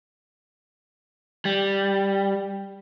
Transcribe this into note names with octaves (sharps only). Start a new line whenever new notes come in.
G3